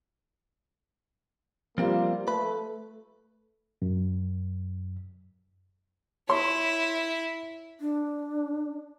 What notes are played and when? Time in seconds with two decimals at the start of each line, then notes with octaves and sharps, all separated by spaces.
1.78 F3 G3 A#3 C4 F4 C5
2.28 A3 B4 B5
3.82 F#2
6.29 E4 C#5 C6
7.81 D4